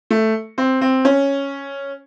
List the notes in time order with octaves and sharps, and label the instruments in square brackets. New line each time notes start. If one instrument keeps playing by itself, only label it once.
[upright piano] A3
C4
C4
C#4